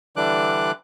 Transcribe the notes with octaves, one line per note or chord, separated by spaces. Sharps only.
D3 E3 G3 D4 D6 F#6